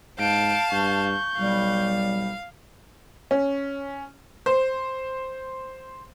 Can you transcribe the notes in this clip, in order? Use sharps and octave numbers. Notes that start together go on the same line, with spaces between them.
G#2 F5 A5 G6 D7
G2 C#6 G6
B1 G3 F5
C#4
C5